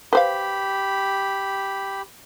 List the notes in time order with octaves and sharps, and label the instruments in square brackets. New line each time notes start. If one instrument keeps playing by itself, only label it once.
[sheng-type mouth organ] G4 B5 [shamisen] B4 C5 F5